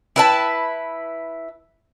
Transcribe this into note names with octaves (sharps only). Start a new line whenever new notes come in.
E4 B4 A5